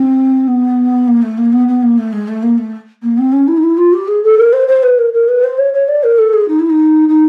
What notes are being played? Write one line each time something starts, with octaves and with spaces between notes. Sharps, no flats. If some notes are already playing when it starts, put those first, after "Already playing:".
Already playing: C4
B3
A#3
A3
A#3
B3
B3
A#3
A3
G#3
A3
A#3
A3
A#3
C4
C#4
E4
D#4
E4
F4
G4
G#4
A4
A#4
C5
C5
B4
A#4
A#4
B4
C5
C#5
C#5
D5
A#4
A4
G#4
D#4
E4
D#4
D#4